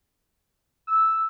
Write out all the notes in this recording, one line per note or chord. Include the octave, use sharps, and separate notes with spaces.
E6